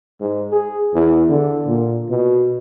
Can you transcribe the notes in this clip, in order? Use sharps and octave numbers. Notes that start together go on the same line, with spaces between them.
G#2
G#4
E2
D3
A#2
B2